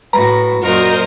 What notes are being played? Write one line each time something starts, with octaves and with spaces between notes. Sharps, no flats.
A2 F#4 B4 A#5
F#2 A#2 F#4 A#4 C5 D#5